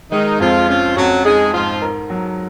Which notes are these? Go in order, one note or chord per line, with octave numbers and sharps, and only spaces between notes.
D#3 G#3 D#4
F2 F3 F4
F3 C#4 F4
F2 F#3 F#4
G#3 D#4 G#4
G#2 F3 F4
A#4
F#3